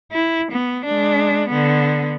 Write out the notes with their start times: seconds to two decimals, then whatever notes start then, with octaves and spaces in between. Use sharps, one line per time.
0.12 E4
0.52 B3
0.86 G#3 D4
1.49 D3 B3